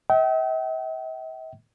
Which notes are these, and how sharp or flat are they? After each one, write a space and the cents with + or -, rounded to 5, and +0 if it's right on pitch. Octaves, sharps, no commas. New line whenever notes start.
E5 -45 G5 -35